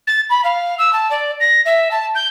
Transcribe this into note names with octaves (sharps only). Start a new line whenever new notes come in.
A6
B5
F5
E6
A5
D5
A#6
E5
A5
G6